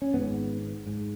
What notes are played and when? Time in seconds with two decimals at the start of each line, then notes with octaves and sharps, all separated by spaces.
0.02 C#4
0.14 G#1 G#2 B3
0.87 G#2